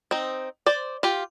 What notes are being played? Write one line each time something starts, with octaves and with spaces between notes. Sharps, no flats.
C4 D#4
C5 D5
F4 G4